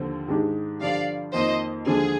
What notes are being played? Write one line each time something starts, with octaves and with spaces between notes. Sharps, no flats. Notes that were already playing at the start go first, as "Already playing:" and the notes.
Already playing: D#2 D3 F3 C4
G#2 D#3 G#3 D4 G4
G2 D3 F3 D5 F5
F2 D#3 A#3 C5 D#5
D#2 D3 F3 G#3 D4 G#4